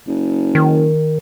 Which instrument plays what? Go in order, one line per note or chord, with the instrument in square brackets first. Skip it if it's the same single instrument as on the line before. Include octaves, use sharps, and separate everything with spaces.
[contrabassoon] F#1
[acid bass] D#3